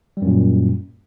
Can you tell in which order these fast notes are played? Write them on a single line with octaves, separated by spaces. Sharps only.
G3 F#2 A#2